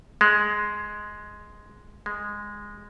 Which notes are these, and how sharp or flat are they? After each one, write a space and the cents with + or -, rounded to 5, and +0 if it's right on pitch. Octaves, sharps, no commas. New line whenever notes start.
G#3 +5
G#3 -10